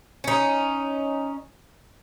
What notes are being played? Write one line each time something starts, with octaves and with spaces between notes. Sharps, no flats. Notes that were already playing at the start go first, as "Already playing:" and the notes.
C#4 D#4